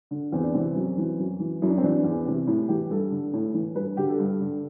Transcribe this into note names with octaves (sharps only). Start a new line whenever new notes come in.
D3
E2 C4
D4
C3 E3 C4
F#2
E3
F#2
E3
F#2 E4
D4
C4
E3 D4
E2
C3 E3
A2
E3 G4
G2 A4
D3
A2
E3
G2 B4
D3 G4
A4
G2
D3